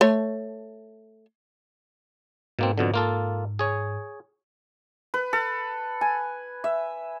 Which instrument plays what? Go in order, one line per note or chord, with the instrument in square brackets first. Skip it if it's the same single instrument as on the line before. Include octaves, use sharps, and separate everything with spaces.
[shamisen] A3 C#5
[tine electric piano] G#2 [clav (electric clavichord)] B2 A#3 C4
[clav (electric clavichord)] F2 B2 D3
A#3 F4 A4
G#4 C#5
[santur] B4
A4
G#5
E5